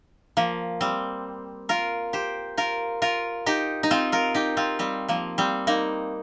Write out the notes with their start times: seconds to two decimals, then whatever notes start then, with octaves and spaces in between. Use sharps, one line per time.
0.37 F3 A#3
0.81 G3 C4
1.69 F4 A#4
2.13 G4 C5
2.57 F4 A#4
3.02 F4 A#4
3.46 D#4 G4
3.83 D#4
3.91 C4 F4
4.12 F4 A#4
4.35 D#4 G4
4.57 C4 F4
4.79 G3 C4
5.08 F3 A#3
5.38 G3 C4
5.67 A#3 D#4